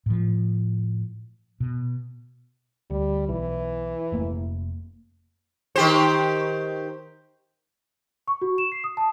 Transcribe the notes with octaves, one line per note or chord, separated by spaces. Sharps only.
A2 F3
B2
D2 G3
B1 E3
F1 A3 A#3
D#3 G4 C5
C#6
F#4
E7
C7
D#6
A5